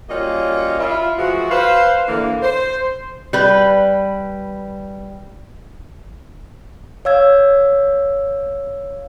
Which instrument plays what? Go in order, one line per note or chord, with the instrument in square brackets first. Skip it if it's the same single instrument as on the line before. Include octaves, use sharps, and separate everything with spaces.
[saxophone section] G3 A#3 C#4 F4 F#4 D#5
E4 F4
E3 F3 G#3 F#4
B4 C5 F5
D3 E3 A#3
C5
[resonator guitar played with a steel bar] G3 B4
[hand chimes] C#5 F5 E6 G#6